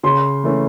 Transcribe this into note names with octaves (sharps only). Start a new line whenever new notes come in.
C#3 C6
E3 A3 C#4